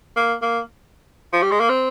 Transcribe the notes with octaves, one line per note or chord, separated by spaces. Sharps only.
A#3
A#3
F3
G3
G#3
A#3
C4